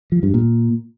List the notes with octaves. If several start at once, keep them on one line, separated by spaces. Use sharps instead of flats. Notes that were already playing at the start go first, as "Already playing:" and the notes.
F3
G2
A#2